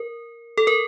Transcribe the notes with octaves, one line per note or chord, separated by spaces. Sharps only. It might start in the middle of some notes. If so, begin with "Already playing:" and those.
Already playing: A#4
A4
A#4